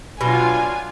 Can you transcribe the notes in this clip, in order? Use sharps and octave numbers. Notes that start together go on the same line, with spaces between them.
B2 F#3 D4 F4 G#5